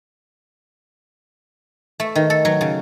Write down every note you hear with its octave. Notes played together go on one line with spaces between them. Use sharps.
A3
D#3
A4
F#3
C#3